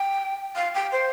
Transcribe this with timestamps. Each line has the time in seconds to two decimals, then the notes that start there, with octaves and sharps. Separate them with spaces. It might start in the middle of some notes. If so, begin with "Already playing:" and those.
Already playing: G5
0.56 F5
0.75 G5
0.92 C5